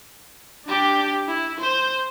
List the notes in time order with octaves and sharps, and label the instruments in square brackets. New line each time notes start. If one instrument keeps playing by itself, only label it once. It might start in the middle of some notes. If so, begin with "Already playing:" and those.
[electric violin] D4 G4
E4
C5